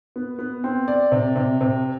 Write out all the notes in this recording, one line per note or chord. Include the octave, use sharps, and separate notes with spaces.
B3
B3
C4
D5
C3
C3
C3